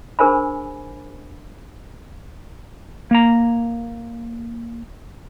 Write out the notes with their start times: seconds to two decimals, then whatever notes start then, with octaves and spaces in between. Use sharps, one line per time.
0.19 D4 G#4 A#4 C5 G#5 B5
3.11 A#3 A#5